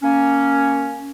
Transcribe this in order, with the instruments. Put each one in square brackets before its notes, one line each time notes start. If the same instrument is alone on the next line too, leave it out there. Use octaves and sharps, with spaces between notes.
[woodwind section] A#3 C#4